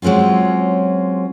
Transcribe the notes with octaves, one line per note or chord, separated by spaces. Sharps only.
F#3 G#3 C4 C#4 F4